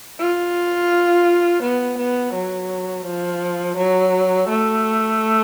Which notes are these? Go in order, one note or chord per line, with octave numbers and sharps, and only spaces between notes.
F4
B3
B3
F#3
F3
F#3
A3